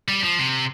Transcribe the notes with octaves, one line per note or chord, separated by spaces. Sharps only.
G3
F3
C3